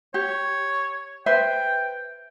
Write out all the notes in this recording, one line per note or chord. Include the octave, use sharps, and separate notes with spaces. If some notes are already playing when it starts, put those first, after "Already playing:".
G4 C#5
B4 C5 E5 G5